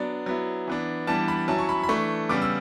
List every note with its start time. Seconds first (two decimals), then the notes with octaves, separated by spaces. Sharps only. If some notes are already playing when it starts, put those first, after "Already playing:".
Already playing: F#3 B3 D4 D5
0.26 F#3 B3 E4
0.67 E3 B3 D4
1.07 E3 G3 B3 D4 A5
1.28 B5
1.48 F#3 C#4 E4 A5
1.59 C#6
1.69 B5
1.83 B5
1.89 E3 A3 D4 C#6
2.29 C#3 G3 B3 D6
2.42 E6